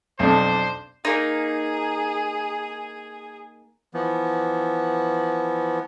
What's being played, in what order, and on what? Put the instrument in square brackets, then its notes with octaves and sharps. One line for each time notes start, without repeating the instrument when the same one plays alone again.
[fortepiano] B1 F2 [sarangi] D4 [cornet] C5
[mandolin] A#3 D#4 [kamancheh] G#4
[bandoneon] E3 F3 B3